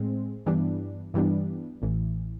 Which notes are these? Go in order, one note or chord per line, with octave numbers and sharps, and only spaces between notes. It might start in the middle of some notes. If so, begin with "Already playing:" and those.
Already playing: A2 G#3 C4
G2 E3 G3 B3 D4
G2 E3 G3 B3 D4
A1 A2 E3